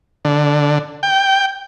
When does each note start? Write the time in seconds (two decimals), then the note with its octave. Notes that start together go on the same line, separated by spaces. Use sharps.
0.25 D3
1.03 G5